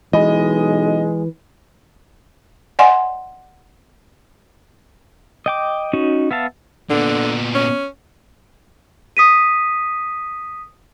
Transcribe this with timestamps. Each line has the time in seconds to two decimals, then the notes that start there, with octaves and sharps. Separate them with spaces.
0.13 B1 E3 G#3 D#5
2.79 D5 D#5 F#5 G#5 C6
5.46 D#5 G5 D6
5.93 C#4 D#4 F#4
6.31 B3 E5 F5 A5
6.90 A#2 D3 B3
7.55 C#4
9.17 D#6 B6 D#7